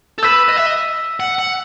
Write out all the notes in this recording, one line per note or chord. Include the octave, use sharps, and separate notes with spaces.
A4
B4 E6 B6 E7
D#5
E5
D#5
F#5
F#5